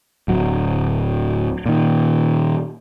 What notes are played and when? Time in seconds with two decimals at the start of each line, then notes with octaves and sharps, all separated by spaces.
0.28 D1 F#3
1.66 A#2 D#3